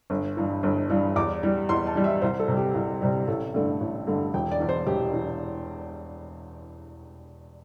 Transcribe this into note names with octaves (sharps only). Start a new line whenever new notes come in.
G1
G2 E3
G1
G2 E3
E2 D6
E3 G3
E2 C6
A5
E3 G3
E5
C2 C5
A4
C3 G3
G4
C2
C3 G3
A1 A4
G2 D3 A3
A1
G2 D3 A3
E1 G5
D5
E2 E3
C5
E1 G4
E3